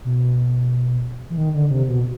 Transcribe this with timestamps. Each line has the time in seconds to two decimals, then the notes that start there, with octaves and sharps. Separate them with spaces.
0.04 B2
1.30 E3
1.37 D#3
1.54 D3
1.70 C3
1.88 B2